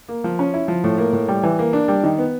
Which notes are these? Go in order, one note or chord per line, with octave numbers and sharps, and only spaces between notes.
A#3
F3
C#4
E4
F3
A2
A#3
A2
G3
E3
A#3
D4
G3
D#3
B3